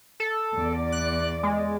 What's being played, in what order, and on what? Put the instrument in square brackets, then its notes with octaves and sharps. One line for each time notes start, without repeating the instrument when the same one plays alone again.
[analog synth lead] A4
[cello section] E2 D5
[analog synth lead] F#6
G#3